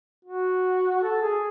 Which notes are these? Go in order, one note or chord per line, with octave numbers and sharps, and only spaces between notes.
F#4
A4
G#4